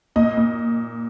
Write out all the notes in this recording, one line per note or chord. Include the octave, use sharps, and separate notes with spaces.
A#2 D#5
A#2